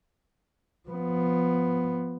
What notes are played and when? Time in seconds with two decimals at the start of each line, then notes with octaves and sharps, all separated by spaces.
0.89 F3 B3